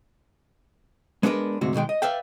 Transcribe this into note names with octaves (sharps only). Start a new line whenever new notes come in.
G#3 B3 D4 F#4 A#4 B4
D2 G#2 C3 F#4
B2 D#3 G#3 G5
D#5
B4 D5 E5 F5 G5